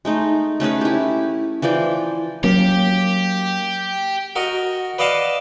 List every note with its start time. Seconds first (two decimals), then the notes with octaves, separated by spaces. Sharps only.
0.05 G#3 A3 D#4
0.60 A3 C#4 G#4 B4
0.81 E4 G4
1.62 E3 F3 D5 G5
2.44 F#3 A#3 C#4 G4
4.36 F#4 A#4 D#5
4.98 B4 D5 D#5 F5 F#5 A5